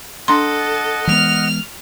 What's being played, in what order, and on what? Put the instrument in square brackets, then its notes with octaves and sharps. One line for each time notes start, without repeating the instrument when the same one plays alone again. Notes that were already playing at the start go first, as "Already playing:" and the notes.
[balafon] D4 C6 [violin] A4 [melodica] D#5 F#5
[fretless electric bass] E3 G#3 B3 [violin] F6 F7